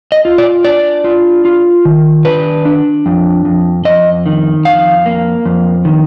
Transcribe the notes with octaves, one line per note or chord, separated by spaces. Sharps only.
D#5
F4
D5
D4 D5
F4
F4
D#3
D4 B4
D4
F2
F2
F2 D#5
D#3
F2 F5
A#3
F2
D#3